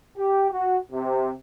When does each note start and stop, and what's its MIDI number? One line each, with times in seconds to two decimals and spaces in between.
0.17 0.46 67
0.51 0.78 66
0.91 1.31 48